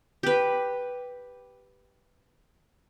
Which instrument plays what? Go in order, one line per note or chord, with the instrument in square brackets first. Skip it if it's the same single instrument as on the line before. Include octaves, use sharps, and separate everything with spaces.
[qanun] G4 B4